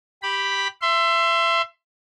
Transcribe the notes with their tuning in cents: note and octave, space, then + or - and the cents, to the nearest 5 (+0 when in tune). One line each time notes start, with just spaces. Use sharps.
G4 +0 B5 +0
E5 +25 C6 +0